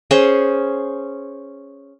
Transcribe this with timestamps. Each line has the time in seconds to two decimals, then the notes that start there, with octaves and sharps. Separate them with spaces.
0.11 C#4 G#4 C5